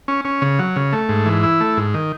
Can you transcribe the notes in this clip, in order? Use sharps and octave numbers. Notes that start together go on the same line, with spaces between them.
C#4
C#4
C#3
F#3
C#3
A3
G#2
E3
E4
A3
G#2
D#3